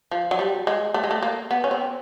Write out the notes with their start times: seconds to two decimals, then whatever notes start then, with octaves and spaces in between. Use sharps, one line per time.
0.11 F3
0.31 F#3
0.39 G3
0.67 G#3
0.94 A3
1.04 G#3
1.11 A3
1.23 A#3
1.51 B3
1.64 C#4
1.71 C4